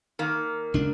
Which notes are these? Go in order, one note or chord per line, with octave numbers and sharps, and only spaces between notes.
D#3 A#3
C#2 D4